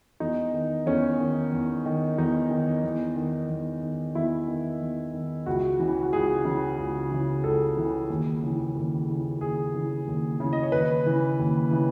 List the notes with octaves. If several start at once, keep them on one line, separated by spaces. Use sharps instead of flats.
E2 D#4
D#3
E2 C#4
D#3
E2
D#3
E2 D#4
D#3
E2
D#3
E2
D#3
E2 E4
D#3
E2
D#3
C#2 F#4
C#3 E3
F#4
C#2 G#4
C#3 E3
C#2
C#3 E3
C#2 A4
C#3 E3
D#2
C#3 E3
D#2
C#3 E3
D#2 G#4
C#3 E3
D#2
C#3 E3
D#5
C#5
D#2 B4
C#3 E3
D#2
C#3 E3